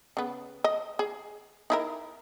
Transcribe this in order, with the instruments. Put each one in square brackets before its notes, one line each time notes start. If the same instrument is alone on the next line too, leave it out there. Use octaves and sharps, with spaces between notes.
[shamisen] C#3 B3
D#5
G#4
D#4 E4 A#4